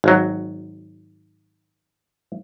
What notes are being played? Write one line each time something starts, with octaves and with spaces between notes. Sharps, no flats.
G#1 F#3